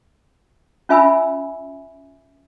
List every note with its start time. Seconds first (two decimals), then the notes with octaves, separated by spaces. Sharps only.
0.89 C#4 F4 E5 G#5 B5 E6